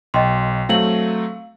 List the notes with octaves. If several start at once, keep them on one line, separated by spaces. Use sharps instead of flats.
B1 D#5 G5 C6
F#3 A3 C4 F5 F#7